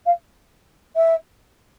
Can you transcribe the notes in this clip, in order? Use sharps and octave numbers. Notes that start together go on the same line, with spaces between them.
F5
E5